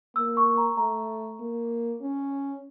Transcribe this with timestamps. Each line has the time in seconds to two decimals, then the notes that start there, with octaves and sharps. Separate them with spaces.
0.16 A#3 E6
0.37 C#6
0.57 A#5
0.77 A3 A#5
1.40 A#3
2.01 C#4